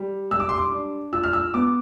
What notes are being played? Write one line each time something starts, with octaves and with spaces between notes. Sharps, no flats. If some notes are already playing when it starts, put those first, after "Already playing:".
Already playing: G3
G3 E6
D6
C6
D6
D4
F4 E6
F6
E6
B3 D6